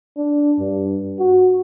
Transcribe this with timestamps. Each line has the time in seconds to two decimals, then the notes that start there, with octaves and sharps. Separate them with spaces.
0.17 D4
0.59 G2
1.19 F#4